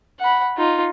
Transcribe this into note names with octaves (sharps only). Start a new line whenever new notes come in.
F#5 B5
D#4 F4